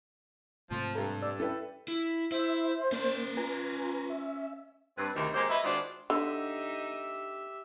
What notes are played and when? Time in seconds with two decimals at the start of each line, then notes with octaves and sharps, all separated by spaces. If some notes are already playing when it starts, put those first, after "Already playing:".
0.71 G#2 C3 F3 A3
0.95 G2 A4 A#5
1.22 D5 E6
1.40 C#4 E4 A4 B4 G5
1.88 E4
2.32 E4 C5 E5
2.92 A#3 C#4 D5
3.37 F4 B4 G#5 A#5
4.10 E5
4.98 G2 C4 B4
5.16 D2 C3 D#3
5.34 G#3 A#3 D#4 G4 C5
5.50 F#3 B4 D#5 E5
5.64 D#3 G#3 D4 F4 F#4 C5
6.10 D3 D#4 G4 E5